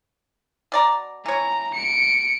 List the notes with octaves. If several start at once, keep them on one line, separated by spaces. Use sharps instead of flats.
B2 D5 A#5
E3 C#5 A#5
C#7 D7